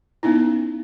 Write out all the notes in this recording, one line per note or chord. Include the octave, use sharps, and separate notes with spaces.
B3 C#4 D#4 E4